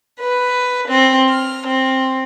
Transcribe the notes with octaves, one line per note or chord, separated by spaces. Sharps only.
B4
C4
F6
C4